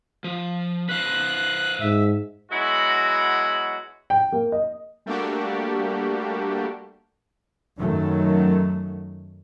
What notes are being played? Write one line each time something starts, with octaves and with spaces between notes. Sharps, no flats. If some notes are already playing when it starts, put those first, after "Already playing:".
F3
B4 C5 F5 F#6
G#2 E5
F#3 G#3 B3 E4 F#4
G5
A#3
D#5
G3 A3 A#3 D4 F#4 G4
F#2 D#3 F#3 A3